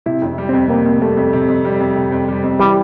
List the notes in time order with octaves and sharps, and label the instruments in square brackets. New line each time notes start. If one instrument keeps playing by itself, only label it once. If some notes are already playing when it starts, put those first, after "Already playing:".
[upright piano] C3 [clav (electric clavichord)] E4
[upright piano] F2
G3
[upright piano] F2 [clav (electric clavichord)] C4
[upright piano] C3 [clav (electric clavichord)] A#3
[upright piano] F2
[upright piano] G3 [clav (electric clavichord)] A3
[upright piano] F2
C3
F2
G3
F2
C3
F2
G3
F2
[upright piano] E3 [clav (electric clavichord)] G3